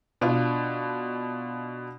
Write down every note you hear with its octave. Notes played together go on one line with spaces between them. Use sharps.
B2 D4 F4